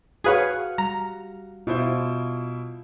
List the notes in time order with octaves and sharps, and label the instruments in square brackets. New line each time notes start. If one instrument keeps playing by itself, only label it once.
[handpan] F#4 F5 F#5 [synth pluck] G#4 B4 C#5
[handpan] G3 [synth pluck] A#5
[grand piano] B2 E4 C5 [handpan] F4